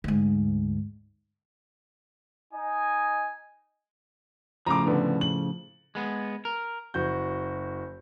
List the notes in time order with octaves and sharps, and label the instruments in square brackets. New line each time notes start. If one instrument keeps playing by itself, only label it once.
[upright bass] D2 G#2
[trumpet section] D#4 D#5 G#5
[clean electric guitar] A2 C#3 F3 [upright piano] A#5 D6
[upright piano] D3 B3
F#7
[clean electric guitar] G#3 B3
A#4
[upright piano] F#1 F#4 G6